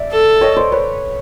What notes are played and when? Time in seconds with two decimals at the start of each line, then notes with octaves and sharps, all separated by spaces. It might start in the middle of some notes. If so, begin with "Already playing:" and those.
Already playing: D5 E5
0.12 A4
0.41 C#5 D#5
0.56 C5 D5
0.72 B4 C#5